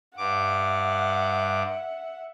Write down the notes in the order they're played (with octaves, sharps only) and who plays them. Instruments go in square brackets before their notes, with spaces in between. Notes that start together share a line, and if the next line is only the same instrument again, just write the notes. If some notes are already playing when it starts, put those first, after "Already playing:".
[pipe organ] G2 D6 [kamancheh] E5 F#5